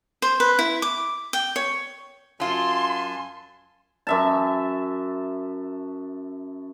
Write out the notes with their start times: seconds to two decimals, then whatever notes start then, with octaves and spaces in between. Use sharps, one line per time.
0.22 C5
0.40 B4
0.59 E4
0.82 D6
1.33 G5
1.56 C#5
2.40 F#2 F#3 F4 G#5 A5 C6
4.07 F#2 E5 A5